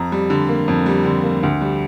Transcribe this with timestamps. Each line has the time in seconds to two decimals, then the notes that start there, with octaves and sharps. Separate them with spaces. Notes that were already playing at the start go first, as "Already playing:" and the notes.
Already playing: F2 A#5
0.12 G3
0.30 D3
0.49 A#3
0.68 F2
0.86 G3
1.05 D3
1.23 A#3
1.43 D2
1.61 G3